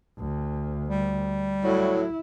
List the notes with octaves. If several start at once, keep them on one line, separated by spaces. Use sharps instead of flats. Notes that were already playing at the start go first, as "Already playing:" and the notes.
D2
G3
A2 F#3 E4